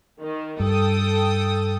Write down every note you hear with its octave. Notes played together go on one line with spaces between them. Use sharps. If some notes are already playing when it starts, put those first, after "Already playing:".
D#3
G2 A4 G5 D#6